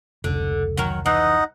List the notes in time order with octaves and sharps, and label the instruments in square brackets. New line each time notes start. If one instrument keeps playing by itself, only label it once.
[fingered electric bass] F1 C#2 [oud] D3
[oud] D#3 F#3 A#4
[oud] E3 [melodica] D#4 D#5 F#5